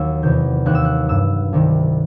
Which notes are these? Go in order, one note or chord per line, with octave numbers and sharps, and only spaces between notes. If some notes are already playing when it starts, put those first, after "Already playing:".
Already playing: D#2 F#3 E6
E2 C3 D#3 G6
D#2 D#3 F#3 F#6
E6
F#6
G2 F#3 E6
C2 C3 D#3